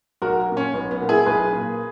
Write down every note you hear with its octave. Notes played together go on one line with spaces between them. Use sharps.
B1 F#4 A#4
A#2 A#3
C#4
B1 B3
B3
A#2 A#3
E4 G#4
B1 G#4 B4
A#2 A#3